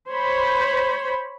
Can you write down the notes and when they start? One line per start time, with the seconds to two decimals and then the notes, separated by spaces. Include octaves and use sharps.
0.11 C5 C#5 B5